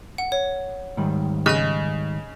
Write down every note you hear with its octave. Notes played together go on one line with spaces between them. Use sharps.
F#5
C#5
G#2 D#3 G3
C#3 D#5 G#5 F#6